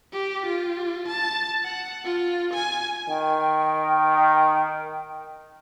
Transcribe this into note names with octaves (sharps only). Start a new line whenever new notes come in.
G4
F4
A5
F#5
F4
G#5
D#3 G5